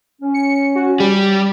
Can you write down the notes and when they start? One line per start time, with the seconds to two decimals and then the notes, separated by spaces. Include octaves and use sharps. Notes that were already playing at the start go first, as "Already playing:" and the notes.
0.22 C#4
0.34 C#7
0.75 F#4
1.00 G3 G4